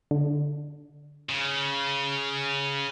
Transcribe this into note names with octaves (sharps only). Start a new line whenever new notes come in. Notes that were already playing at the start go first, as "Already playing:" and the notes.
D3
C#3